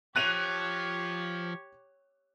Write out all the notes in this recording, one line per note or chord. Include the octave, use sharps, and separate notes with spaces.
F3 G4 C#5 F#6 D#7 F7